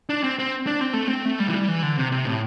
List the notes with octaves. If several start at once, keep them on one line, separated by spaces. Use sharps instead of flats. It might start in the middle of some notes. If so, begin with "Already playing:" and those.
D4
C4
C4
D4
C4
A3
C4
A3
G3
E3
G3
E3
D3
C3
C3
A2